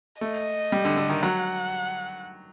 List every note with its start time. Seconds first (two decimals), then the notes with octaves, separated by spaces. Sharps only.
0.21 A3 D#5
0.72 G3
0.85 D3
0.97 D3
1.10 D#3
1.22 F#3 F#5